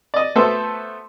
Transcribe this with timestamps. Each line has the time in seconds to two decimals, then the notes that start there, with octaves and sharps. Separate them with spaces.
0.14 D5 D#5
0.35 A3 B3 F#4 A4 C5 E5